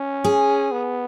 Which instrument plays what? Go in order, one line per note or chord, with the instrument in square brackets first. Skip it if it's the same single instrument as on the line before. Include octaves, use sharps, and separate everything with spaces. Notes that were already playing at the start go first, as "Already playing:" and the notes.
Already playing: [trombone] C#4
[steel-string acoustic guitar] G#4
[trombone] B3